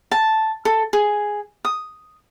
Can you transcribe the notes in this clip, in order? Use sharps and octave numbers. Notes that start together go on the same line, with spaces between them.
A5
A4
G#4
D#6